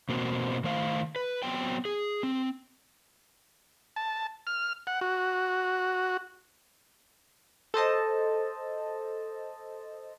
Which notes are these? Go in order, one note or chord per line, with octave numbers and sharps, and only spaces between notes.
B2 A#3 C4 F#4
D#3 A3 C5 F5
B4
F#3 B3 C4 G5
G#4
C4
A5
F6
F#5
F#4
A4 C5 D#5 A5